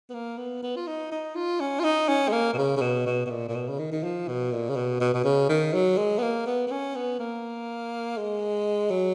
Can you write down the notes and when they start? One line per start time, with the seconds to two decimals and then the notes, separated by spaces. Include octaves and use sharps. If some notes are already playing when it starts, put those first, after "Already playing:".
0.10 B3
0.14 A#3
0.38 B3
0.63 B3
0.76 F4
0.87 D#4
1.12 D#4
1.35 F4
1.60 C#4
1.80 F4
1.84 D#4
2.08 C#4
2.28 G#3
2.32 A#3
2.54 B2
2.58 C#3
2.77 C#3
2.81 B2
3.06 B2
3.26 B2
3.30 A#2
3.49 A#2
3.55 B2
3.69 C#3
3.79 D#3
3.92 D#3
4.04 F3
4.28 B2
4.52 A#2
4.69 C#3
4.76 B2
5.01 B2
5.14 B2
5.24 C#3
5.49 D#3
5.74 F#3
5.98 G#3
6.18 B3
6.22 A#3
6.46 B3
6.67 B3
6.71 C#4
6.95 B3
7.20 A#3
8.17 G#3
8.91 F#3